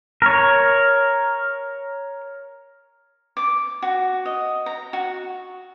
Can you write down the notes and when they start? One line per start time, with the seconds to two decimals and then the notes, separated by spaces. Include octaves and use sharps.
0.22 A#4 C#5
3.37 D6
3.82 F#4
4.26 D#5
4.66 A#5
4.93 F#4